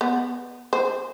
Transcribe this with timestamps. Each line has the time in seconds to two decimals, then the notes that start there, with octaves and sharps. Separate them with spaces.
0.01 B3
0.73 C5